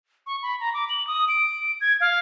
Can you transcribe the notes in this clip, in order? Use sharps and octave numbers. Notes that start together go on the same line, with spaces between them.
C#6
B5
A#5
D6
F#7
D#6
D7
G#6
F5